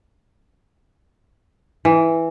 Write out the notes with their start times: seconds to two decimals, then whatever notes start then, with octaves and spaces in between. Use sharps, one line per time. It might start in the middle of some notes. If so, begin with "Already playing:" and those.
1.85 E3